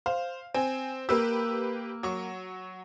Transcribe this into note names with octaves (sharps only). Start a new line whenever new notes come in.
C5 F5
C4 G#5
A#3 G4 B4 E6
F#3 C#6